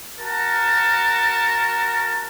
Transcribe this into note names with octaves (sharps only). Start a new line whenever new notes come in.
F#4 A#4 A5